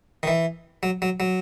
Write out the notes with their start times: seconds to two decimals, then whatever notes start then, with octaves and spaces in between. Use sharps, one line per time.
0.23 D#3
0.27 E3
0.83 F#3
1.02 F#3
1.20 F#3